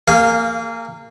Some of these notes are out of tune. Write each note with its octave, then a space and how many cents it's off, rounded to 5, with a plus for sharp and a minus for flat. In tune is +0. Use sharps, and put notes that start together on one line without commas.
A#3 -25 G#4 -5 F5 +0